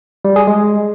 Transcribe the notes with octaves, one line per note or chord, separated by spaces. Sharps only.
G3
G#4
G#3